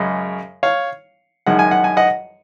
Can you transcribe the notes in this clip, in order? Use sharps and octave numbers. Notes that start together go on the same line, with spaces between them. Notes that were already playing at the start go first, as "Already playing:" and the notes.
Already playing: F#2 C#3 G#3
C#5 F5
F#2 D#3 G#3 F#5
G#5
F#5
G#5
D#5 F#5